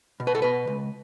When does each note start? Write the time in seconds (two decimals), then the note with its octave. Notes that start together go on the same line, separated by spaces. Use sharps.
0.20 B2
0.27 B4
0.35 A4
0.42 B2 B4
0.67 C#2